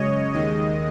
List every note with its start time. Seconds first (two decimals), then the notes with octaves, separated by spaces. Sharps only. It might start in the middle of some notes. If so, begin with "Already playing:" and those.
Already playing: F#2 C#3 G#3 C#5 D#5
0.33 D#2 D#3 G#3 D#5